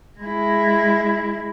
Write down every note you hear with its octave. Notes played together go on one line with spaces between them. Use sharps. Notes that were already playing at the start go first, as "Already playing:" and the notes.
G#3 E4